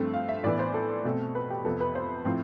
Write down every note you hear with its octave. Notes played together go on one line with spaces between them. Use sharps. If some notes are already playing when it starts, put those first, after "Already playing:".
Already playing: G2 F3 A3 C4
F5
E5
A2 E3 B3 D5
C5
A4
B2 A3 C4
B4
G4
F2 C3 F3 B3 A4
B4
C5
A2 F3 C4